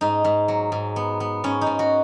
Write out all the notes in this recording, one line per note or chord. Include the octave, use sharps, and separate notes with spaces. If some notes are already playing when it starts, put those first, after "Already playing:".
G#2 D#4
G#2
F#3
G#2
B3
B3
G#2 C#4
D#4
G#2
F#4